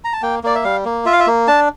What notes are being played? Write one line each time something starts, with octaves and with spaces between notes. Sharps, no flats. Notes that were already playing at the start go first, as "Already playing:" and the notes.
A#5
A5
A#3 G5
A#3 D5
E5
G3 F5
A#3
F4 E5
F5
E5
A#3
D4 A5